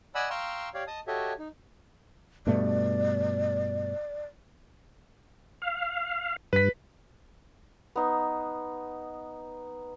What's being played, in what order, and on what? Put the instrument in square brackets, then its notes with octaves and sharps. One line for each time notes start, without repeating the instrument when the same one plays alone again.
[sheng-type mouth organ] D5 D#5 F#5 G#5 B5 E6
F5 G5 A#5 C6 C#6 E6
G4 C#5 D5 F5
D#5 A5 D#6
F#4 G4 A4 C#5 D#5 E5
D#4
[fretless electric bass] G2 B2 A3 [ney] D5
[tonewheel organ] F5
[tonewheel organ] G2 [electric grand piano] B4 B6
[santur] B3 D#4 C6